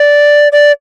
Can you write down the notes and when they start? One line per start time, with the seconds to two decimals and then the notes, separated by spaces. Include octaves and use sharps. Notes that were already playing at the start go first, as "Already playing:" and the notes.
Already playing: D5
0.52 D5